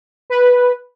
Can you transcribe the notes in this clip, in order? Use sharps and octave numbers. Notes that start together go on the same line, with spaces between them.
B4